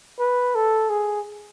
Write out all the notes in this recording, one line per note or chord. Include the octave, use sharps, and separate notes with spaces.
B4
A4
G#4